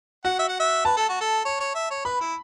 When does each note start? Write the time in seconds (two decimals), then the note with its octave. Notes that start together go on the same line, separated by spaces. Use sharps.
0.25 F#4 F#5
0.39 E5
0.49 F#5
0.60 E5
0.85 B4 A5
0.97 A4
1.09 F#4
1.21 A4
1.45 C#5
1.60 C#5
1.75 E5
1.91 C#5
2.05 B4 B5
2.21 E4